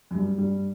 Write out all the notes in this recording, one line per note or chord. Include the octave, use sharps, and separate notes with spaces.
F#2
G2 G3
G2 G3